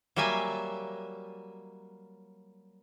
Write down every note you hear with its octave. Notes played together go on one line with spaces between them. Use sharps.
F#3 G3 A#3 E5 G#5